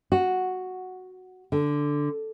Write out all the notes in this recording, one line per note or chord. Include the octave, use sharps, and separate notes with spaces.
F#4
D3